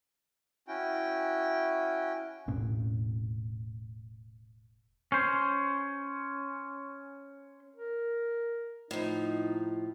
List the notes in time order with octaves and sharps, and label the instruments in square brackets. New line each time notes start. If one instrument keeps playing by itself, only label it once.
[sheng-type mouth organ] C#4 E4 F#4 G5
[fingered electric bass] E1 A2 C#4
[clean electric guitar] C#4 C5
[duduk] A#4
[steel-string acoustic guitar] A2 F3 [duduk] D#4